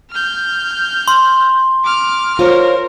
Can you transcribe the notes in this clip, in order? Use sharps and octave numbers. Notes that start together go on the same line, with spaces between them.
F6 G6
C6
D6 F6
F4 A#4 C5 C#5